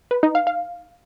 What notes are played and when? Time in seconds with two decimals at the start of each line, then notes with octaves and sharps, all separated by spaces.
0.11 B4
0.23 D#4
0.35 F5
0.47 F5